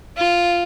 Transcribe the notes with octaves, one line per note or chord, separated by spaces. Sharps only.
F4